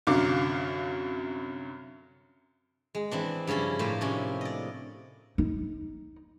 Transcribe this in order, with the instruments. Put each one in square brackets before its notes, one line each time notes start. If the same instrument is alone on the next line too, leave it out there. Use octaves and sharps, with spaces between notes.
[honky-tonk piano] C2 F#2 D3 F5 D6
[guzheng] G#3
E3 C4 D4
G2 C#3 F3 C#4 E4
A2 A3 A#3 C5 A5
C3 C#4 D4
D5 D#5
[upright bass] D#4